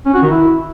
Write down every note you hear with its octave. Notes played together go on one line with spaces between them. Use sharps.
C#4
F#4
D#3
E4